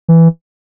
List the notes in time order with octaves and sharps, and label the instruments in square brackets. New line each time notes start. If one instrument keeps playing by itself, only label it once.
[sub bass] E3